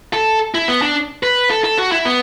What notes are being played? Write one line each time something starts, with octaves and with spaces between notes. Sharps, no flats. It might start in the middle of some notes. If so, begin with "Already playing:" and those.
A4
E4
B3
D4
B4
A4
A4
F#4
E4
B3